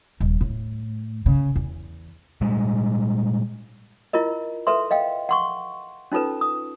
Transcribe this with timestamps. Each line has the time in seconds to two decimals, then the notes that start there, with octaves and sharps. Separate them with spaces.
0.20 D#1
0.41 A2
1.26 C#3
1.56 E2
2.41 A#2 G3 G#3
4.13 E4 F4 A#4 D#5
4.67 A4 B4 E5 C6
4.91 D#5 F5 G5
5.29 F#5 C6 C#6
6.12 C#4 D#4 F4 A4 B4
6.41 D#6